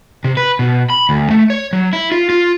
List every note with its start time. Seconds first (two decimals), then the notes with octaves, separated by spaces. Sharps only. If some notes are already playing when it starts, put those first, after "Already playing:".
0.24 C3
0.37 B4
0.59 B2
0.90 B5
1.09 D2
1.30 A3
1.50 C#5
1.73 F#3
1.93 E4
2.12 F4
2.30 F4